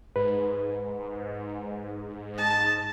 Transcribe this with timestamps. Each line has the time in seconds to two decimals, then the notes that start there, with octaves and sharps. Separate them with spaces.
0.16 G#2 B4
2.36 D#5 A5